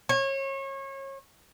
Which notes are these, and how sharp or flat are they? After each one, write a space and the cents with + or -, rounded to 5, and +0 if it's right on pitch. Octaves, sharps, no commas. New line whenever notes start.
C#5 -30